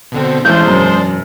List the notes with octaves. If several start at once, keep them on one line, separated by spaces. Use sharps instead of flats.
B2 D3 C4
A1 G#3 D4 C5 G6
E1 F#2